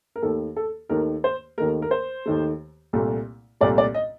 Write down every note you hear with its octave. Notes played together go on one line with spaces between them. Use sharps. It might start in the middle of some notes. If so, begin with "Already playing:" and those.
A#4
D#2 D#3 A3 A4
A4
D#2 D#3 A3 A#4
C5
D#2 D#3 A3 A#4
A#4
C5
D#2 D#3 A3
C2 A#2 A3
C2 A#2 A3 D5
D5
D#5